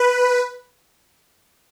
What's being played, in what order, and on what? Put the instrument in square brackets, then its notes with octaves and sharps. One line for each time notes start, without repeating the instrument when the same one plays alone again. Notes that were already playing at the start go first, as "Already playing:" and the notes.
Already playing: [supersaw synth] B4